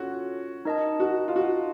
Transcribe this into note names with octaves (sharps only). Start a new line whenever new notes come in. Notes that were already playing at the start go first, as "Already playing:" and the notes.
Already playing: C#4 F4 F#4 A4 C#5
D#4 A#4 D#5 A5
F#4
F4
F#4